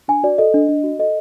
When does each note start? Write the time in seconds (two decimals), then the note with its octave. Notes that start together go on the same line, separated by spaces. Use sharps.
0.08 D4 G#5
0.23 F#4 D5
0.38 A4 D#5
0.54 D4
0.69 D4
0.84 F#4
0.99 A4 D#5